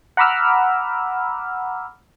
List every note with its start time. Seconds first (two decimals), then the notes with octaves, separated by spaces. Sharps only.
0.17 F#5 A#5 B5 D6 E6 F6